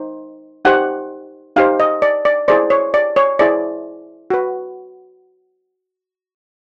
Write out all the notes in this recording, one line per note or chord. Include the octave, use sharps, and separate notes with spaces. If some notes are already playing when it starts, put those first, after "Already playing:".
Already playing: D#4 C5
D#4 G4 C5 F#5
D#4 G4 C5 F5
D#5
D5
D5
E4 G#4 C5 D5
C#5
D5
C#5
E4 G#4 C5 D5
F#4 B4